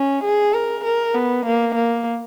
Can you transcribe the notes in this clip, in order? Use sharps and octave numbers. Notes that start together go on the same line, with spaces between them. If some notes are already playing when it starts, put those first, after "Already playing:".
Already playing: C#4
G#4
A#4
A#4
B3
A#3
A#3